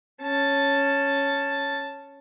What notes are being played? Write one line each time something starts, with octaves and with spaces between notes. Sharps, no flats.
C#4 A5